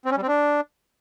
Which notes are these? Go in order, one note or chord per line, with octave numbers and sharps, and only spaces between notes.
C4
C#4
G3
C4
D4